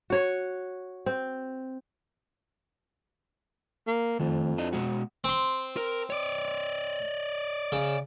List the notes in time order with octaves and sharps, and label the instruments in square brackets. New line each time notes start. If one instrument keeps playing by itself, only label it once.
[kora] F#4 C#5
C4
[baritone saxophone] A#3
[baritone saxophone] F2 [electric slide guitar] D#3 A3
[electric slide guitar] D4 E4 D#5
B2 G#3 F#4
[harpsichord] C4 C6
[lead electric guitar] A#4
C#5 D5
[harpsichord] C#3